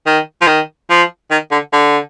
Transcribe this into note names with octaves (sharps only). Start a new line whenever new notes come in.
D#3
F3
D#3
F3
D#3
D3
D3